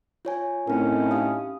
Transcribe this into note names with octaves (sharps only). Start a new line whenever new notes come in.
F4 C#5 G#5
A2 C4 C#4 D#4 A#4
G4 F5 D#6